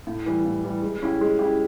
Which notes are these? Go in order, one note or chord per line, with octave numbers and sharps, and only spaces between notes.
A2
E3 G3
A2
E3 G3
G#3
C#4 E4 G4
G#3
C#4 E4 G4